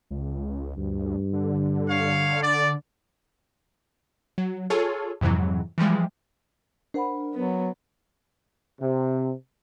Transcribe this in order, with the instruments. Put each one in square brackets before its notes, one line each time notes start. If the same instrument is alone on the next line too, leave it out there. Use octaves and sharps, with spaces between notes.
[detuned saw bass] C#2
[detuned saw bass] D2 [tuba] G2
[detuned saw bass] D3
[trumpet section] C#5 F5
D5
[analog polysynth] F#3
F4 G#4 A4 C#5
F2 G#2 C3 E3 F#3
E3 F3 G3 G#3
[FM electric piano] D4 A#4 [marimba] C5 F#5 B5
[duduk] F#3 [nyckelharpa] B3
[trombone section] C3